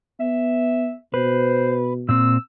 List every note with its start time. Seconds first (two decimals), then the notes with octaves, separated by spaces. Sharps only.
0.20 B3 E5
1.14 B2 B4 C5
2.09 A#2 C4 E6